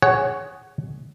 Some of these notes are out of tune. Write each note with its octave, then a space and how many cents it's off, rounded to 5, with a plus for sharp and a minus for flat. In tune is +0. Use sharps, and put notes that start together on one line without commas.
G#4 -5 C#5 +0 F#5 +20